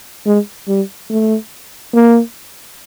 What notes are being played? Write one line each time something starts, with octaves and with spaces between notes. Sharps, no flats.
G#3
G3
A3
A#3